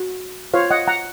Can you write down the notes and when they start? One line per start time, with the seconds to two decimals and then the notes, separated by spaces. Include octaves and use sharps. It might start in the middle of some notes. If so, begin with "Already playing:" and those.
Already playing: F#4
0.54 F4 C5 C#5 F5
0.71 D#5 F#5
0.87 F#5 A#5